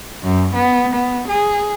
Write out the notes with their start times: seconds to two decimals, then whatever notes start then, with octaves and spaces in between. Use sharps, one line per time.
0.23 F#2
0.55 B3
0.93 B3
1.28 G#4